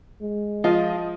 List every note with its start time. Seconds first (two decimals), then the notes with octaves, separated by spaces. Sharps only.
0.22 G#3
0.64 F3 F4 D#5